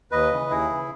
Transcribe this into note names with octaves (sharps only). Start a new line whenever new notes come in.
D#2 B4 D#5
C#3 E3
D#2 E4 G#4
C#3 E3